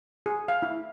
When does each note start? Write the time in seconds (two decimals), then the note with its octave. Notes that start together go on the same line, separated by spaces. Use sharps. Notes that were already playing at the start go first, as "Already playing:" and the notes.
0.26 G#4
0.48 F5
0.62 E4